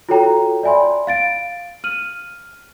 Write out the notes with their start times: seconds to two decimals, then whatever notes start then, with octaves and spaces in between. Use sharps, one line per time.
0.09 F4 F#4 A4 C#5 G5 A#5
0.63 D5 E5 G#5 B5 C6
1.07 F5 A6 D7
1.84 F6 D#7 F#7